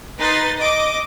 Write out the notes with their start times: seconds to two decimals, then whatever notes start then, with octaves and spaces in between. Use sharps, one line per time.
0.18 D#4 B4 C6 A6
0.57 D#5 D6